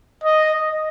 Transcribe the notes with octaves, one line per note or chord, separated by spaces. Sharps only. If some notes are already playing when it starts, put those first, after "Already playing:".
D#5